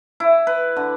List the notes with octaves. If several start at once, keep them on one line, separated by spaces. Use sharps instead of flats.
E4
B4
D3